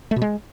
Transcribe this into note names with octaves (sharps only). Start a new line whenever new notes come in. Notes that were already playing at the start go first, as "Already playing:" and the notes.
A3
B2
G#3